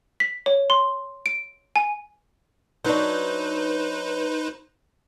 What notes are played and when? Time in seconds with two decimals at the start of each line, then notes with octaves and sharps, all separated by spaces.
0.20 B6
0.46 C#5
0.70 C6
1.26 D7
1.76 G#5
2.85 F#3 D4 D#4 B4 C5